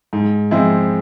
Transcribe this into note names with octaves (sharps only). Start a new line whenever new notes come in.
G#2
F3 G#3 C4 E4